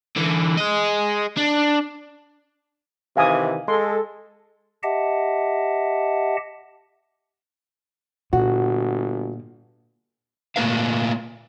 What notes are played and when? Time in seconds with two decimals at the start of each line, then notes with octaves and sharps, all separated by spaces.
0.16 D3 E3
0.57 G#4 D#5
1.37 D4
3.17 C3 D#3 E3 F5 G#5 D#6
3.68 G#3 A4 C6
4.83 G4 D#5 E5 F#5 A5
8.33 G1 A#2 F#4
10.56 A#2 A3 A#3 D4 B4 F5